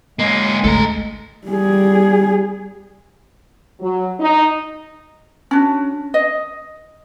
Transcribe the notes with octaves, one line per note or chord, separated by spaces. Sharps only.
G#3 A#3 C#4
G#1 D2 A3 A4 A#5
G3 G#4
F#3
D#4
C#4 D4 F#4
D#5